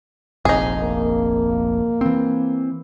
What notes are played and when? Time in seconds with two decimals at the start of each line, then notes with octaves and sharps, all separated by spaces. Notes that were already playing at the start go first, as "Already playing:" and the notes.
0.45 F1 A#1 F2 D#4 G#4
0.80 A#3
2.01 E3 C4